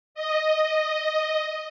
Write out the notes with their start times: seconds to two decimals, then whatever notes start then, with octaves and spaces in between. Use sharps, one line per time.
0.15 D#5